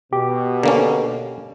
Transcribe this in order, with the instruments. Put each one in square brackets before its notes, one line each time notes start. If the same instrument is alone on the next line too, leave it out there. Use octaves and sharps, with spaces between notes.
[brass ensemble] B2 [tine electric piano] G4
[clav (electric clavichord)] D3 A#3 C#4